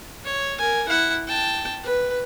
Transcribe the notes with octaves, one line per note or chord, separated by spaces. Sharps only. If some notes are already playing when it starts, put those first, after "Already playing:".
C#5
A#4 G#5
E4 F#5
G5 A5
B4